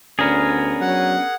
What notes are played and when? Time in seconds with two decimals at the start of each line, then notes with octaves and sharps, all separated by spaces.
0.19 D2 B3 C#4 D4 G#4 A#4
0.81 F#3 F#5